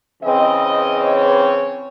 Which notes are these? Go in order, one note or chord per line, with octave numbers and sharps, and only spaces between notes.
C#3 E3 C4 D#5
C#5